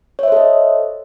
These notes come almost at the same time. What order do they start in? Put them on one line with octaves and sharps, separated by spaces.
C#5 E5 C5 A4 D#5